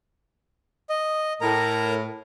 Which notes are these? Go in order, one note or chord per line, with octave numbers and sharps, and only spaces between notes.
D#5
A2 A#4 A#5